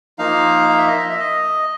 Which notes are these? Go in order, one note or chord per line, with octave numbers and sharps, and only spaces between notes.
F3 A#3 D#4 F5
F5
E5
D#5
E5
E5
D#5